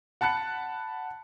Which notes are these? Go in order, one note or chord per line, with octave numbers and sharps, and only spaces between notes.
F#5 A5 B5 F#6 C#7